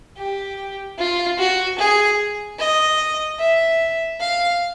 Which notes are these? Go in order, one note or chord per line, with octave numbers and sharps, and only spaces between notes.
G4
F4
F#4
G#4
D#5
E5
F5